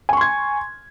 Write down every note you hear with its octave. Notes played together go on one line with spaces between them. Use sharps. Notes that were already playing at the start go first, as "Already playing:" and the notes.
G#5 C6 C#6 G#6